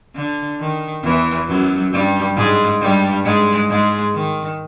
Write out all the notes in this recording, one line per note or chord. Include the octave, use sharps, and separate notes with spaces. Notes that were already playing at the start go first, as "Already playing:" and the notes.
D3
D#3
E2 E3
F#2 F#3
G2 G3
G#2 G#3
G2 G3
G#2 G#3
G#2 G#3
D#3